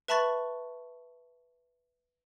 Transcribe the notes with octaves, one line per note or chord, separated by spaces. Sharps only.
B4 E5 A5 B5 C#6 A6